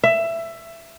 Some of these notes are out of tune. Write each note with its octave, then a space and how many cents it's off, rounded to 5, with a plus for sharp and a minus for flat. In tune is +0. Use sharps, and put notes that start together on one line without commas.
E5 +15